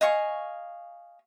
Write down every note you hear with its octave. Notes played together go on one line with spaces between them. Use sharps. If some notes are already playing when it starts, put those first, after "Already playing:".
D#5 F5 G#5 C#6